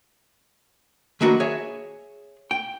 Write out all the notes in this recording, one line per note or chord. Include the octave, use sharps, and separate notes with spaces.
D#3 F#3 A#3 D4 F#4 B4
G#4 C#5 E5
G5